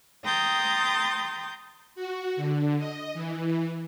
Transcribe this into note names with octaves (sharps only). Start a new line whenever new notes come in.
G5 A#5 C6 D#6 G6 A6
F#4
D3
D#5
E3